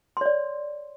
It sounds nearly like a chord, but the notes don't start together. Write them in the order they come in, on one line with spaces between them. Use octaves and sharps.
C6 C#5 D5